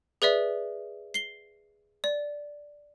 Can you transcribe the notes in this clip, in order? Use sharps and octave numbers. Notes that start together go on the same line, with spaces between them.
G#4 B4 D5 E5
C7 G7
D5